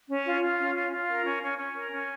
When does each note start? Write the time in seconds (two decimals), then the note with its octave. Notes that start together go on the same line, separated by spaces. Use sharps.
0.09 C#4
0.26 F4
0.42 F4
0.59 C#4
0.76 F4
0.92 F4
1.09 A#4
1.25 C#4
1.42 C#4
1.59 C#4
1.75 A#4
1.92 C#4